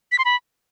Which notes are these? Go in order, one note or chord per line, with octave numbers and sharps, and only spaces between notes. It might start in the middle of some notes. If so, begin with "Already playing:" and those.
B6
C6
B5